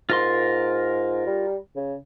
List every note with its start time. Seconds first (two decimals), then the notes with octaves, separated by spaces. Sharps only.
0.10 G#2 F4 A#4 C6
1.26 G3
1.76 C#3